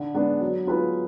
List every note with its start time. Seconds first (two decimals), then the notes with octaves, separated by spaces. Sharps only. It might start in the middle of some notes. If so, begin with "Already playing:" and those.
Already playing: D3
0.14 G#3 B3 D4
0.41 F#3
0.67 B3 F4 G#4 B4